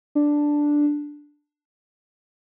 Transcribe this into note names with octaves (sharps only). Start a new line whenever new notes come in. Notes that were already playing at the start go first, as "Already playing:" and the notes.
D4